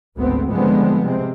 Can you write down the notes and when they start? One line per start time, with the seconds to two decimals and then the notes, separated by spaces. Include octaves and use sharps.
0.16 G#1 D2 G#2 B3 C4
0.50 D3 F3 G3 G#3 B3 C4
1.04 C3 G#3 C4